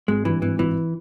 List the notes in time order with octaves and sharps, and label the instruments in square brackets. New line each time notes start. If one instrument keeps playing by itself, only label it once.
[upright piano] G#1 [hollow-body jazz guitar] G#3
[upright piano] G2 [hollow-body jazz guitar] E3
[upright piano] G#1 [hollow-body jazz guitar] E3
[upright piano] G#1 [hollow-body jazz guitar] E3